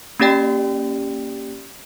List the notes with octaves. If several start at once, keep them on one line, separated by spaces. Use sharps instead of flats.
A#3 C#4 G4 D5 G5